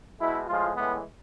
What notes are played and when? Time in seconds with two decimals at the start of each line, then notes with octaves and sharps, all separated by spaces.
0.18 B2 G#3 E4
0.47 A2 F3 G#3 F4
0.75 A2 E3 G#3 B3